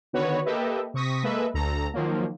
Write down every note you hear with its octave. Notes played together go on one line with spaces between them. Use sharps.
D3 D#3 B3 F#4 B4 C#5
A#3 G4 A4 B4 D#5 E5
C3 C#6 D#6 A#6 B6
G#3 A#3 A4 B4 D#5 E5
D2 A4 A#5
D#3 F3 F#3 A#3